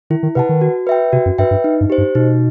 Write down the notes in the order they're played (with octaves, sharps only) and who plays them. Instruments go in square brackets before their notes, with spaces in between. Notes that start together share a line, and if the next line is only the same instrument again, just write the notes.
[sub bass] D#3 [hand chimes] E4
[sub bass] D#3
[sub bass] C3 [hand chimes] B4 F#5 A5
[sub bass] D#3
[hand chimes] F#4
B4 E5 G5
[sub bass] C3 [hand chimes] F#4
[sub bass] F#2
[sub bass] G2 [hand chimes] B4 E5 G5
[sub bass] G2
[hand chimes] D#4
[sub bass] G2
[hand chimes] G4 C5
[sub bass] G2
[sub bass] B2 [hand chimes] D#4